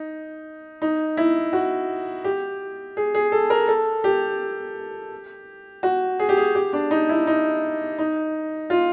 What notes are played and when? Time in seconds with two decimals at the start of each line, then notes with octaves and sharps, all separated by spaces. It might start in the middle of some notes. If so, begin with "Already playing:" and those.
Already playing: D#4
0.82 D#4
1.17 E4
1.53 F#4
2.24 G4
2.97 G#4
3.15 G#4
3.32 A4
3.50 A#4
3.68 A4
4.04 G4
5.83 F#4
6.19 G#4
6.29 G4
6.37 G#4
6.55 G4
6.73 D4
6.91 D#4
7.09 E4
7.27 D#4
7.99 D#4
8.70 F4